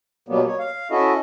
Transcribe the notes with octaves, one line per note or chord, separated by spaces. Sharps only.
B2 F#3 G3 A#3 B3
C#5
F5
C#4 E4 F#4 A4 D#5 E5